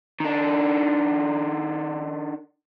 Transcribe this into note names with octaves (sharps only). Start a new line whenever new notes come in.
D#3 D4